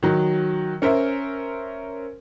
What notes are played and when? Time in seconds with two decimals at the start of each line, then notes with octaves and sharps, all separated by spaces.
0.03 D#3 F#3
0.82 C#4 A#4 C5 E5